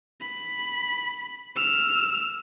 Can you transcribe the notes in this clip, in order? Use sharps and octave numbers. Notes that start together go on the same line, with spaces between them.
B5
E6 F6